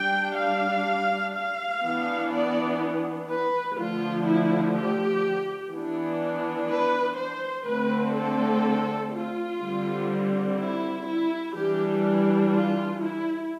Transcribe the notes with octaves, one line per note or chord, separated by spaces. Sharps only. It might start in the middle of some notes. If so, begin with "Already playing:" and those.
Already playing: G3 D4 G5
F5
F5
E3 B3 D4
D5
B4
D3 F3 A3 F4
E4
G4
E3 B3 D4
B4
C5
D3 A3 C4 B4
A4
F4
D3 G3 C4
E4
E4
E3 G3 D4 G4
F4
E4